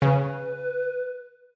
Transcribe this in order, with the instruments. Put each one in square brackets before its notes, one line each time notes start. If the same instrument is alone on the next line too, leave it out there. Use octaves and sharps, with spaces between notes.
[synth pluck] C#3 [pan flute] B4